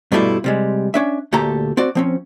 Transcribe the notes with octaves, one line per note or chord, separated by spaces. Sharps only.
G2 B2 G3 A3 E4 F4
C3 G3 G#3
C#4 D4 E5
D2 A#2 A3 G4 A4 A#5
C4 F#4 D5
F3 C4 C#4